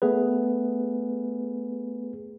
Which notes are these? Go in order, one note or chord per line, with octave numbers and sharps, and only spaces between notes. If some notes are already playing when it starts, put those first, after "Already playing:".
A3 B3 G#4 B4